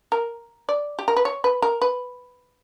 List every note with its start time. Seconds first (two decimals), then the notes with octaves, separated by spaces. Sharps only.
0.12 A#4
0.69 D5
0.99 G4
1.08 A#4
1.16 B4
1.25 C#5
1.44 B4
1.62 A#4
1.82 B4